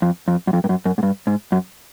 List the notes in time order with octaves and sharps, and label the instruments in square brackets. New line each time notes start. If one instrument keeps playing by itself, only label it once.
[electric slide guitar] F2
F2
F#2
F2
G2
F#2
F#2
G#2
G2
G#2
F#2